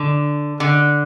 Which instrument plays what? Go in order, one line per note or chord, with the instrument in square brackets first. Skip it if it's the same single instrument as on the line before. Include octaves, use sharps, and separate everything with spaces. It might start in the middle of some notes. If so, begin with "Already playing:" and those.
Already playing: [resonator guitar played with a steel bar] D3
D3